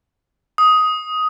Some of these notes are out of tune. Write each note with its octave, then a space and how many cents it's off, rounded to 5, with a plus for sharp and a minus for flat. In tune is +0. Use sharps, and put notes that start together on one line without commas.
D#6 +10